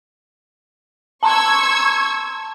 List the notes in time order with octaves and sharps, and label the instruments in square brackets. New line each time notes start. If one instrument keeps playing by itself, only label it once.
[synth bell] A5 A#5 C6 [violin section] C#6 E6 G#6